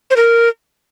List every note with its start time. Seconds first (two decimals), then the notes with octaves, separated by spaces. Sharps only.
0.10 C5
0.16 A#4